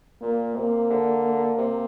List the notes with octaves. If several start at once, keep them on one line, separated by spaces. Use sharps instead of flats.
A#2 A#3
C3 A#3
D3
C3